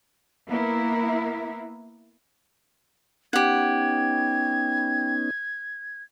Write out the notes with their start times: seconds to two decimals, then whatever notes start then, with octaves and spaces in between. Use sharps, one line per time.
0.48 A#3 B3 E4 A#4
3.33 B3 C#4 D#4 G4 F#5 G#6